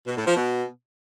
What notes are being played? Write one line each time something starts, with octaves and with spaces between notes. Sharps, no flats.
B2
A2
F3
B2